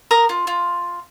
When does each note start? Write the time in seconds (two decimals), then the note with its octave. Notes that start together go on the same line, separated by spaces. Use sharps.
0.11 A#4 A#5 D#6
0.29 F4
0.47 F4